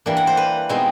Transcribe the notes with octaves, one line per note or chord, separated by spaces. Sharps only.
E3 G3 A#3 D4
F#5
C5
B4
B2 G#3 C4 D#4